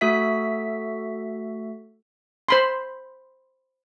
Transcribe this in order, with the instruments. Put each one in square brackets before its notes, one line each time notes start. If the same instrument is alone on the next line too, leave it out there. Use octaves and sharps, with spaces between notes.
[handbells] A3 F#4 A4 E5 B6
[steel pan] C5 B5 C6